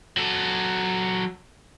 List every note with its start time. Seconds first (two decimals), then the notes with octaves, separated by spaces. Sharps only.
0.17 F#3 A4